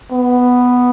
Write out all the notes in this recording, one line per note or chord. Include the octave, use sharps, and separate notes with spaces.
B3